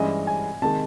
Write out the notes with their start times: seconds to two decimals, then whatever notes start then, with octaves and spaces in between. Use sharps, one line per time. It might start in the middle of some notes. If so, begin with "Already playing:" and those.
Already playing: G2 E3 G#3 C#4 D#5
0.27 G#5
0.62 C3 D#3 G#3 A5